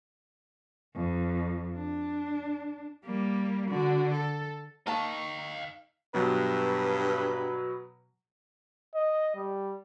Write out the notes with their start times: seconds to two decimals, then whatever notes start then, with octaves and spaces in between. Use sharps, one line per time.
0.95 F2
1.75 D4
3.05 G3 A#3
3.69 D3 F#4
4.12 A4
4.87 A#3 D#4 D#5 F5 A5 C#6
6.14 G2 B2 F#3 B4
8.95 D#5
9.35 G3